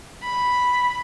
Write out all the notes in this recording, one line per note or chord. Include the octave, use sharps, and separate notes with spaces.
B5